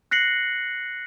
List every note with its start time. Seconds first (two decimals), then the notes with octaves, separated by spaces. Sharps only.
0.11 F#6 A#6 C7 C#7 F#7